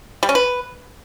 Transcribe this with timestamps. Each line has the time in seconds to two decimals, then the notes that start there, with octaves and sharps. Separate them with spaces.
0.23 G3
0.29 C#4
0.35 B4